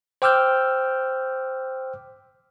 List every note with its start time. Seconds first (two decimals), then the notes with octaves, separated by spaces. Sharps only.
0.22 C5 G5 D6 E6 F6 G6